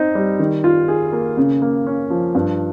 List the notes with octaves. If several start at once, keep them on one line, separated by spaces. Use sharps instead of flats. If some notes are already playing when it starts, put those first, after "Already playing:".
Already playing: C4 D#4
G3
D#3
F4
G#4
A#3
C#3
A#3
C#4
F3
G2